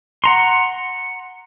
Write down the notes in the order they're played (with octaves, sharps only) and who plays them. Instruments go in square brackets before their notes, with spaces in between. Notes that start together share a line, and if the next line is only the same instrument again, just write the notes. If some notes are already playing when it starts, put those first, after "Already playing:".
[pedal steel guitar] F#5 A#5 C6